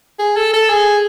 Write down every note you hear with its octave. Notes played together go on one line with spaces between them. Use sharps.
G#4
A4
A4
G#4